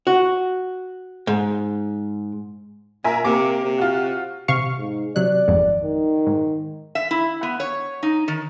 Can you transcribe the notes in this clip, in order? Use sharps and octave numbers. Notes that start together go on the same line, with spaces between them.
F#4
G#2
A#2 A#4 E5 G#5
C3 A#3 D6
C3
F4 F#4
C3 F5 C#6
G#2
C3 F#3 D5 F#6
G#1 F2 G#2
D#3
G#2
E5
E4
B3
C#5
D#4
D#3